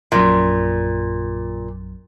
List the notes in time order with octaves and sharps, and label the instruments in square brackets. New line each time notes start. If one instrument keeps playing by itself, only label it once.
[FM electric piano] A#1 F#2 [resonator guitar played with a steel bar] A#2